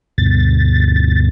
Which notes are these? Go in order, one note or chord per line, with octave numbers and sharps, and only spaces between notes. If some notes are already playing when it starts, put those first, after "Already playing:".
D2 G2 B2 A6